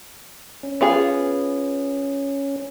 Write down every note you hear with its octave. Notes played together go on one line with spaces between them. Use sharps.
C#4
B3 F4 G#4